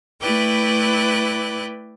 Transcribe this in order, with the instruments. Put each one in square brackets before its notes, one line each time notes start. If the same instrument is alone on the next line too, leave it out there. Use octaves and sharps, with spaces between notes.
[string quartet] A3 E4 B4 D5 G5 F#6